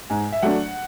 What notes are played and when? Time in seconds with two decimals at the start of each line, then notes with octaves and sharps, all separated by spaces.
0.10 G#2 G#5
0.32 E5
0.43 F#3 A3 D4 F#5